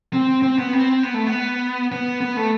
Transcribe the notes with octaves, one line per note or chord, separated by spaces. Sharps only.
C4
C4
B3
C4
B3
A3
B3
B3
B3
A3